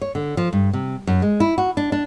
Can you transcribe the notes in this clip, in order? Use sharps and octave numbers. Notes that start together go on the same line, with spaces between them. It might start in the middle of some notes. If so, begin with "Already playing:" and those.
C#5
D3
F3
G2
C3
F#2
G#3
E4
F#4
D4
D4